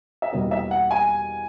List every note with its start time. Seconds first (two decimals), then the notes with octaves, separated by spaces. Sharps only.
0.22 E5
0.33 E2 B2 G3 A#3 D#5
0.51 E5
0.71 F#5
0.91 G#5